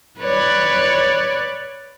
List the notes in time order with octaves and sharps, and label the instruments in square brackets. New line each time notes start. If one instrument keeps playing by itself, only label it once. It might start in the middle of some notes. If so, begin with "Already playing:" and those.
[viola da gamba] B4 C#5 D5